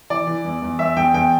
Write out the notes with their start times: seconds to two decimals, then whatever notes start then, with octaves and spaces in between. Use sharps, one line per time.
0.10 E3 D5
0.27 E3
0.45 E2
0.62 E2
0.79 E2 E5
0.96 E2 G5
1.14 E2 G5